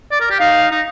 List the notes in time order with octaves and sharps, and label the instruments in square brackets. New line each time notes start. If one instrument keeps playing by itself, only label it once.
[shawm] D5
A#4
G4
[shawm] D#4 [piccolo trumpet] F5
[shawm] D#4